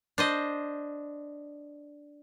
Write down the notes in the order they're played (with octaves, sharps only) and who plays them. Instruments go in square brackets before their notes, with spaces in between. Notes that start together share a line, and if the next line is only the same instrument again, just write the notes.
[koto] D4 C5 D#5